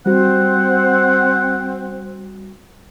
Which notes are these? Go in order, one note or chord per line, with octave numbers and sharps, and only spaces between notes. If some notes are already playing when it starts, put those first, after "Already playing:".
G3 C4 F#4 C5 F#5